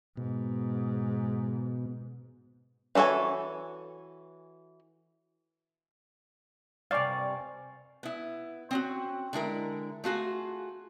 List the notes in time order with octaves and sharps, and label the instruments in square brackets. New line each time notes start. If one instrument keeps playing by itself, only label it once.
[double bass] G#2 [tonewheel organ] B2
[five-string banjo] E3 F#4 A4 C#5 G#5
[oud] G2 C3 [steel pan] D5 F5 [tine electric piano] G#5 C#6 A6
[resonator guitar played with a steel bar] B3 E4
C4 C#4 F#4
D3 G#3 E4 A#4
A3 F4 F#4 G#4